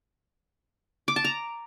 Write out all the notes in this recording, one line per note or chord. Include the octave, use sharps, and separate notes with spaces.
D6
A5
A#5